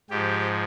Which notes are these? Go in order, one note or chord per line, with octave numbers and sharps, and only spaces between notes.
G#2 F3 G4